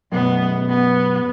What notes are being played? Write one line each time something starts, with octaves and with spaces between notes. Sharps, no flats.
F#2 B2 B3
B3